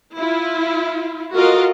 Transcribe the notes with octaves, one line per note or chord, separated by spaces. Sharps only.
E4 F4
F4 F#4 A4 A#4 D#5 F5